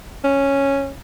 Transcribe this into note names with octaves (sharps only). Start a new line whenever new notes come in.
C#4